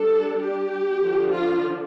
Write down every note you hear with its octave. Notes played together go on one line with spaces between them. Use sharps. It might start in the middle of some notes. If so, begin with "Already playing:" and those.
Already playing: G3 D4 A4
G4
D3 F3 D4
F4